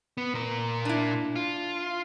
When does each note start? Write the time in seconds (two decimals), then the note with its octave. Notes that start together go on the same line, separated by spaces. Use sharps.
0.17 B3
0.34 A#2 A#4
0.85 D4 E4
1.36 F4